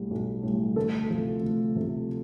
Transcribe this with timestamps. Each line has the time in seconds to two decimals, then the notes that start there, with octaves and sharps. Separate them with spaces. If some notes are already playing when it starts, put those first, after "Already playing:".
Already playing: B1 A2 G3
0.11 B1
0.43 A2 G3
0.76 D2 A4
1.09 C3 F3 A3
1.42 D2
1.75 C3 F3 A3